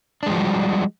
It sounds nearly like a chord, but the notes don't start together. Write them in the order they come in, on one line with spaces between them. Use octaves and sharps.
D4 G#3 F3 F#4 G3